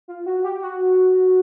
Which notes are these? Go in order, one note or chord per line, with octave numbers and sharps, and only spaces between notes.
F4
F#4
G4
F#4